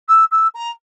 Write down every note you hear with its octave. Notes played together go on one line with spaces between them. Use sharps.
E6
E6
A#5